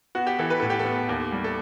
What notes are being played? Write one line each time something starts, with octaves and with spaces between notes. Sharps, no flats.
B3 F#4
G4
E3 A4
B4
A2 A4
G4
A4
B3
D#2 G4
G3
A4